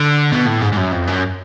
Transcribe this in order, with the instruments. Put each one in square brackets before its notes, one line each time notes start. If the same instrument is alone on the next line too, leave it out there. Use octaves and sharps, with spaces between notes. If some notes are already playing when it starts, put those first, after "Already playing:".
Already playing: [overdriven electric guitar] D3
B2
A2
G#2
G#2
F#2
F2
F#2